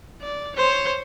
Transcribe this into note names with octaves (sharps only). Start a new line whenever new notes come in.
D5
C5 C#5